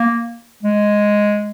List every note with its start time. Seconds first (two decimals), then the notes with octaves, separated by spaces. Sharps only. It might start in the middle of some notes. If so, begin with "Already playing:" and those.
Already playing: A#3
0.63 G#3